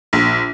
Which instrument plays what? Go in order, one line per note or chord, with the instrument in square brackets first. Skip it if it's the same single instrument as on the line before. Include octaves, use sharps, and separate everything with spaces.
[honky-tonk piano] A#1